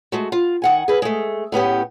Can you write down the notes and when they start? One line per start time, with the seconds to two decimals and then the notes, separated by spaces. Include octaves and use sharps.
0.12 G#3 A3 F#4
0.32 F4
0.62 D#3 F#5 G#5
0.88 G#4 B4
1.02 G#3 A3
1.52 A2 B3 C#4 G4